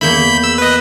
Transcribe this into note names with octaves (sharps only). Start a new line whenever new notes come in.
E2 A#3 E4 B5 G6 B6
E6
B4 D#5